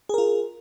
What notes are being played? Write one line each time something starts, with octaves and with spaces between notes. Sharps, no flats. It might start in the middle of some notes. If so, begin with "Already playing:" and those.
F4 G#4 A#4